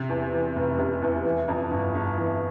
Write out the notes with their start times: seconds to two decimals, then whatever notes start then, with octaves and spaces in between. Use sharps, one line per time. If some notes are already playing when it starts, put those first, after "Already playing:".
Already playing: C3
0.09 E2
0.33 E3
0.56 F1
0.79 C3
1.02 E2
1.25 E3
1.48 F2
1.71 G1
1.95 G1
2.17 E3